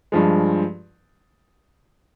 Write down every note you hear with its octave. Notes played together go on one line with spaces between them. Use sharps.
G2 F3 G#3